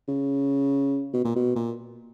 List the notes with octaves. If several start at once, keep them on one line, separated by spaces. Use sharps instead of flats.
C#3
B2
A#2
B2
A#2